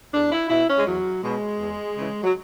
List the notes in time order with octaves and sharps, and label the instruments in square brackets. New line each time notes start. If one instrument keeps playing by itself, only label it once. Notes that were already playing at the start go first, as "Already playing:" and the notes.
[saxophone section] E2 D4
E4
B2 E4
C#4
G#3
E2 F#3
B2 G#3
E2
C#3 E3
F#3